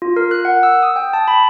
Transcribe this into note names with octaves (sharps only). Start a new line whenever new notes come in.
F4
A#4
F#6
F#5
E6
D#6
G5
A5
B5